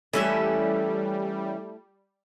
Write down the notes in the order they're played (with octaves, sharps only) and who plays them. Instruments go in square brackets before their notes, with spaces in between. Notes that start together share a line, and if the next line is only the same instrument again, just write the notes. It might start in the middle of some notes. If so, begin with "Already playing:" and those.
[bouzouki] E3 C#4 E5 [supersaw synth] G3 [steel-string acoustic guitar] A3 E4 A4